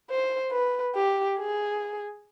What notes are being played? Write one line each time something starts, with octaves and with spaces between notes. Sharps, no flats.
C5
B4
G4
G#4